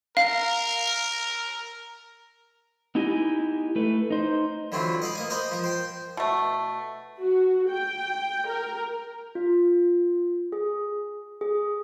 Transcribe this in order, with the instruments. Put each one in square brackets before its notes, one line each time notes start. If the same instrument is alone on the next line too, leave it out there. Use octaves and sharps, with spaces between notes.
[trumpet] A#4 [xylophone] F5
[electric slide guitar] B3 D#4 E4 G4 D#5 G#5
A3 B4
D#4 C5
[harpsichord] D3 E3 F#3 C4 E4 F4
D#5 F5 B5 D6
A#3 D#5 G#5
A#4 C5 D#5 G#5 B5 C6
F3 A#4
C5 G5 C6
[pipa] B2 A3
[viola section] F#4
G5
A#4
[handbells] F4
G#4
G#4